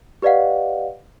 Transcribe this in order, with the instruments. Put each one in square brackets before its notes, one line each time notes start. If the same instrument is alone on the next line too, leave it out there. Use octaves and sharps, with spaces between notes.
[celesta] G4 B4 D5 D#5 F5 F#5